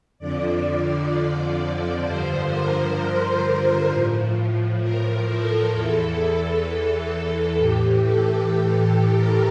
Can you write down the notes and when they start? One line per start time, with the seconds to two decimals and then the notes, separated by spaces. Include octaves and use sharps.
0.18 F2 D3 F3 D5
2.04 G2 D3 F3 C5
2.50 A#4
3.89 A2 F3
4.80 A#4
5.28 A4
5.73 E2 E3 A4
6.20 A4
6.66 A4
7.57 A2 E3 G4
8.04 A4
8.50 G4
8.81 A4
9.13 A#4